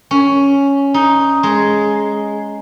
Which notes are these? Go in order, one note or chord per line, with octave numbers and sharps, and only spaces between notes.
C#4
D#4
G#3